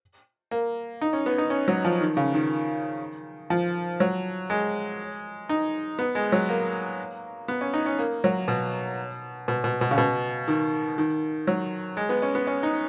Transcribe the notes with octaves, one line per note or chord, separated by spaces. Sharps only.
A#3
D#4
C#4
B3
D#4
C#4
F#3
F3
D#3
C#3
D#3
F3
F#3
G#3
D#4
B3
G#3
F#3
A#3
B3
C#4
D#4
C#4
A#3
F#3
B2
B2
B2
B2
C#3
B2
D#3
D#3
F#3
G#3
B3
C#4
B3
C#4
D#4